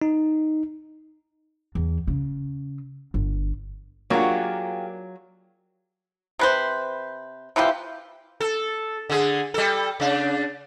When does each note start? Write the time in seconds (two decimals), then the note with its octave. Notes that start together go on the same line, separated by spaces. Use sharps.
0.02 D#4
1.75 E2
2.07 C#3
3.14 G1
4.10 F#3 A#3 D4 F4 G4 G#4 F#5
6.39 C3 B4 C5
7.56 C3 E3 F4 G4
8.40 A4
9.10 D3 G#4
9.54 G3 A4
10.00 C#3 D4